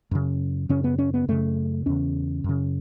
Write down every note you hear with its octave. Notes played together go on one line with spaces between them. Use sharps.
F#2 C#3
F#2 C#3 C#4
B3
C#4
B3
F#2 C#3 A3
E2 C#3 C#4
F#2 C#3